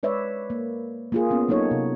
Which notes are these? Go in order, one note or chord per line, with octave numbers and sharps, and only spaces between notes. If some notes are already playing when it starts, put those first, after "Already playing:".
G#3 B4 C#5 D5 E5
A#3
A#3 F4 G#4
B3 C#4
F#3 A#3 D#4 A4 C#5
C3